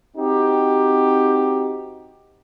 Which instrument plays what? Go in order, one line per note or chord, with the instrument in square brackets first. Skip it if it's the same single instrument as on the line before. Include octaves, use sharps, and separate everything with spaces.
[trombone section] C4 D#4 F#4 G4